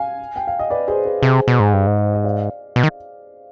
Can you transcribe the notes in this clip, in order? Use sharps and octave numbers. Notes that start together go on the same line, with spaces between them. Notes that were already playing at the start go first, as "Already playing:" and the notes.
Already playing: F5 G#5
G5
F5
D#5
B4 D5
G#4 C5
B4
C3 G#4 C5
B2
G#2
G2
G#2
D#5
D5 F5
B2
D#3